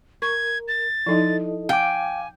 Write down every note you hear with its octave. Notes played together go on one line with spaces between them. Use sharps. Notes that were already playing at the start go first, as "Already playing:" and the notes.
A#4 C#6 G#6
A6
F3 D#4 E4 A4 D#5
F5 G5 G#5 D6